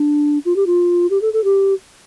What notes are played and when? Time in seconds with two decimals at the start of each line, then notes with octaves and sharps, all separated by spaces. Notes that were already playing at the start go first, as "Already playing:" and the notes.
Already playing: D4
0.45 F4
0.56 G4
0.66 F4
1.10 G4
1.22 A4
1.33 A4
1.44 G4